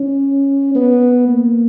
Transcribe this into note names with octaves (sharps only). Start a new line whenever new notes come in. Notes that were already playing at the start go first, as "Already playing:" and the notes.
Already playing: C#4
B3
A#3